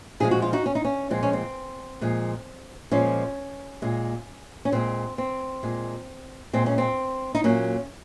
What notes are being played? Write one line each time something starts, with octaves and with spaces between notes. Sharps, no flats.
A#2 F3 G#3 G#4
F#4
F4
D#4 F#4
C#4
D#4
C#4
A#2 F3 G#3 C4
C#4
C4
A#2 F3 G#3
A#2 F3 G#3 C#4
A#2 G#3
C#4
A#2 G#3 C4
C4
A#2 G#3
A#2 G#3 C4
C#4
C4
D#4
A#2 F#3 A#3 C#4